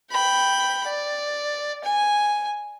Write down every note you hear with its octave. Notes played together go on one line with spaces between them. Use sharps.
G5 B5
D5
G#5